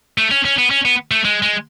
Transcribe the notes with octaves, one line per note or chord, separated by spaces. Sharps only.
A3
C#4
C#4
B3
C#4
B3
A3
G#3
G#3